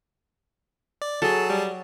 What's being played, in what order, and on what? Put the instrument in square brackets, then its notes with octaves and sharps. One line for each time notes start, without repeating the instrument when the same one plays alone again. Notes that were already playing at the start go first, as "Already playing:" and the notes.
[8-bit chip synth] D5
[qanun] F#3 [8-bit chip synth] G#4 A5 [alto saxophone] A4
[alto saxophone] G3